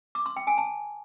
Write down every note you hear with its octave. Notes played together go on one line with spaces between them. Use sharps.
D6
C6
G5
G#5
A5